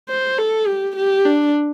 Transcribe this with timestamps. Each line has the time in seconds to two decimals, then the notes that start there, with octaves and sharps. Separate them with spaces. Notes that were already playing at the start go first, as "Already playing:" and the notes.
0.09 C5
0.38 A4
0.67 G4
0.96 G4
1.25 D4